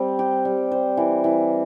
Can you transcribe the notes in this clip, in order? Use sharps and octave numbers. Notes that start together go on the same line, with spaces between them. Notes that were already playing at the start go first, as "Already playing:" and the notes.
Already playing: G3 C4 C5
G4
G3
C5
E3
E3